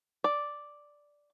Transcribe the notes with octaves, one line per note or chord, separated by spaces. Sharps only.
D5